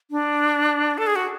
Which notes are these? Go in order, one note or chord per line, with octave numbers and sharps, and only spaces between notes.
D4
A4
G#4
F#4